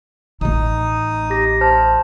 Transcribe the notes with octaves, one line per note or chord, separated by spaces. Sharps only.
A1 A3 D#4 D#6
G4 A#6
C5 A5 F6